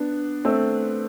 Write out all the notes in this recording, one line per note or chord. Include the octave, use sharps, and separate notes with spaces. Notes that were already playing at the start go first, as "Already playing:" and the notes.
Already playing: B3 D4
A3 C4